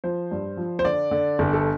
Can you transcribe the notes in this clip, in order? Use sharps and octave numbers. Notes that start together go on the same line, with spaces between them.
F3 C5
G2
F3
C5
D3 D5
D3
G1
A4